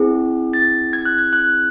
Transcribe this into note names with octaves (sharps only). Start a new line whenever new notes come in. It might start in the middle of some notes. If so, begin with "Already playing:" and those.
Already playing: C4 E4 G#4
A6
G#6
F#6
G#6
F#6